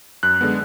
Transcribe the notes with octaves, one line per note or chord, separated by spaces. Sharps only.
F#2 F#6
D3 G#3 B3